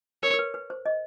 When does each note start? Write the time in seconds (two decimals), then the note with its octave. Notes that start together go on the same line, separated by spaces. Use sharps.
0.23 A#4 C#5
0.34 A#4
0.39 B4
0.54 B4
0.70 C5
0.86 D#5